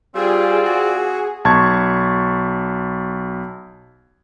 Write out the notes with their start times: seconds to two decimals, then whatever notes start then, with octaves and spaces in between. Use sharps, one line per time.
0.15 G3 C4 F4 G#4 D5
0.66 F#4
1.45 B1 A5 C6 C#6 G#6